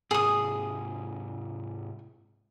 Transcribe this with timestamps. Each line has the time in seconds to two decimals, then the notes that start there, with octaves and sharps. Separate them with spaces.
0.11 G#2 C3 G#4 D#6